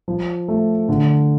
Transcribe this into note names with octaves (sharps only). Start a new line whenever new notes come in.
F3
A3
D3